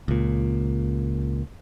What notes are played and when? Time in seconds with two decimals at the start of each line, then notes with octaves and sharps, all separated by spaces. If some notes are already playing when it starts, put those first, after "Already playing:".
0.08 C#2 A#2